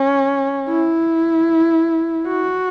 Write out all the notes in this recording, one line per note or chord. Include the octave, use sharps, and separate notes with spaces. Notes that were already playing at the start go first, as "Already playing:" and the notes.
Already playing: C#4
E4
F#4